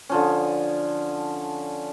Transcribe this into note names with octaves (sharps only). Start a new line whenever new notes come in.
D3 F3 C#4